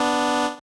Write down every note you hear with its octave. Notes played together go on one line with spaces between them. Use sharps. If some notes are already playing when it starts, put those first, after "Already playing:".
Already playing: B3 D4